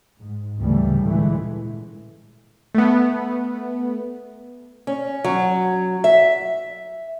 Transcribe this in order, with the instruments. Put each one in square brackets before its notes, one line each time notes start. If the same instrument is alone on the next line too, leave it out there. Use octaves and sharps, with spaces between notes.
[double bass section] G#2
D2 A2 C#3 E3 G3 A3
A#2 D3 E3 G#3 A3
[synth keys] A3 B3
[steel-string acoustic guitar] C#4
F#3
E5